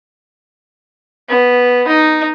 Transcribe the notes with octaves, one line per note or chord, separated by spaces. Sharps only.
B3
D#4